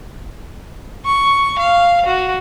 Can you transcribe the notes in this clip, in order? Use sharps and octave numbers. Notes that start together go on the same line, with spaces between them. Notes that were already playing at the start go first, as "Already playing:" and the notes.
C#6
F5
F#4